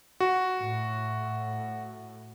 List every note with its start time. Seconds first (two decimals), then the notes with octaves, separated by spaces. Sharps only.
0.20 F#4
0.58 A2